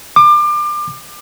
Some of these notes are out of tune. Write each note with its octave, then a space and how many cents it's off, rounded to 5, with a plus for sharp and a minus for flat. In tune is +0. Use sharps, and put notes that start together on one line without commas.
D6 +30